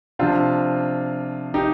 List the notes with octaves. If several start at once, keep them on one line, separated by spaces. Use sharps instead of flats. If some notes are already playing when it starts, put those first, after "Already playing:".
C3 F3 D4 F4
D#4 G4